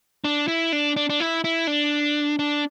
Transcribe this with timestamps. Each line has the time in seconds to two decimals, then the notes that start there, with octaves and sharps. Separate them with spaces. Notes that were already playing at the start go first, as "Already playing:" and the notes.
0.24 D4
0.48 E4
0.72 D4
0.96 D4
1.10 D4
1.20 E4
1.44 E4
1.67 D4
2.39 D4